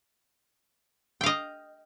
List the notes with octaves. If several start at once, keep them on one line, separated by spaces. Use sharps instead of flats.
D#5 F5 G5